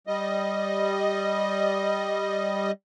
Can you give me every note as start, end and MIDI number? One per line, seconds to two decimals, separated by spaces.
0.07 2.71 55
0.07 2.71 75